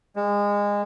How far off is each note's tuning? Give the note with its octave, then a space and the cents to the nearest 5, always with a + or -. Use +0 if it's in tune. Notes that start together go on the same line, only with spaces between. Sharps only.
G#3 -25